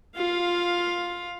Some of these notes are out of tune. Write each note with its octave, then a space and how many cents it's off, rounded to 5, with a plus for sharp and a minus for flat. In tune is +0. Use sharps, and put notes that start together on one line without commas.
F4 +0 F5 +10